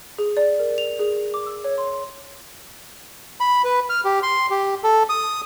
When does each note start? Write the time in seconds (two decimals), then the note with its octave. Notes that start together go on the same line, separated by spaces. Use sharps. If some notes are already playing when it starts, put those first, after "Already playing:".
0.18 G#4
0.37 D5
0.59 A#4
0.78 F7
0.99 G#4
1.34 D6
1.46 E6
1.64 C#5
1.78 C6
3.40 B5
3.64 B4
3.90 F6
4.05 G4
4.23 C6
4.50 G4
4.84 A4
5.09 D#6